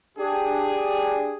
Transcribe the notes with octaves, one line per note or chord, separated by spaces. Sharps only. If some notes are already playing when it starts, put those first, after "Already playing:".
D4 G4 G#4